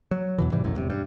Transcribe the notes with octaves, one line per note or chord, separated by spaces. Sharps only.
F#3
E2 B2 E3
G#2 C3 E3 G3
E1 C2 F#2 A2
E1 C3
G2